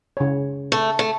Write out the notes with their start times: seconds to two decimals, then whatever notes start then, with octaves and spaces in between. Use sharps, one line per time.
0.17 C#3 C#5
0.72 A3
0.99 A3